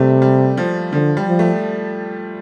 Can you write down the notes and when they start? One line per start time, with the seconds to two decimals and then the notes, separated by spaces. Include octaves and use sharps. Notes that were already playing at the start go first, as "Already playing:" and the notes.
Already playing: C3 G3 A3
0.22 G3
0.57 F3
0.93 D3 F3
1.17 G3
1.28 F3
1.39 A3